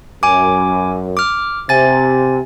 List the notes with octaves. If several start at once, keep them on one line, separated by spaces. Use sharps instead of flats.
F#2 G#5 D6
D6 F6
C3 G#5 A6